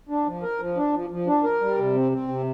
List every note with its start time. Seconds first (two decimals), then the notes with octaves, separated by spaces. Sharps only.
0.09 D4
0.26 F3
0.43 A#4
0.60 F3
0.77 D4
0.94 F3
1.10 F3
1.27 D4
1.44 A#4
1.61 G3
1.78 C3
1.95 C4
2.12 C4
2.28 C3